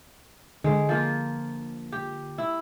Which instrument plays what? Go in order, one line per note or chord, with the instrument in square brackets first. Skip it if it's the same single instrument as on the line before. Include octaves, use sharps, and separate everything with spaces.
[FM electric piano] D3 [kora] G#3
[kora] F3 A#3 F4
G4
E4